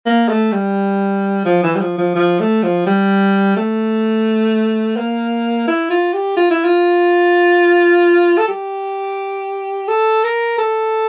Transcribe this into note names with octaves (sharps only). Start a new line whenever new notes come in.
A#3
A3
G3
F3
E3
G3
F3
F3
F3
A3
F3
G3
A3
A#3
E4
F4
G4
F4
E4
F4
A4
G4
A4
A#4
A4